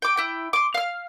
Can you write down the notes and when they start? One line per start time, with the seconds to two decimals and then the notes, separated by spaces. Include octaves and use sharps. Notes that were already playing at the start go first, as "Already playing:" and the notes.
0.02 G5 D6
0.17 E4 G5
0.53 C6 D6
0.74 F5 F6